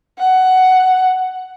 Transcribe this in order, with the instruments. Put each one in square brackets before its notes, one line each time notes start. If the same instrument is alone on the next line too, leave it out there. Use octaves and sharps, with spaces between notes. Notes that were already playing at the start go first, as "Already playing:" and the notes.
[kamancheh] F#5